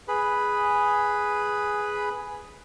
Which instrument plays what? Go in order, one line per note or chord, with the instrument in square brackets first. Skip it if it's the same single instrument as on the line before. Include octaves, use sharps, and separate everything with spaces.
[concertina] G#4 B4 B5